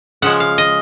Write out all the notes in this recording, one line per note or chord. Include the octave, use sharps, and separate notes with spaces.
C#3 F3 G#3 F#5
F5
D#5